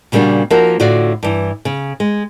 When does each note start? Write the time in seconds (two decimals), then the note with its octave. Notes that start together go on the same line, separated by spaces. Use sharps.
0.12 A#2 C#3 G3 A#3 D4 F#4
0.50 F3 A#3 D#4 F#4 A#4
0.80 A2 D3 F4 F#4 D5
1.23 G2 E3
1.65 C#3
2.00 G#3